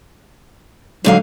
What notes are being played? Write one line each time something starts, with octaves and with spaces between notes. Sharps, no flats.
G#2 D3 F#3 F5